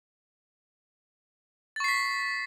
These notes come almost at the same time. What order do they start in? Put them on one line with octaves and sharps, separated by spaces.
A6 C#6 C7 B6